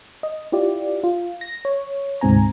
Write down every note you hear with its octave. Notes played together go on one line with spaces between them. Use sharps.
D#5
E4 F4 G4 D5
F4
A#6
C#5
D2 G#2 C3 C4 G#5 A#5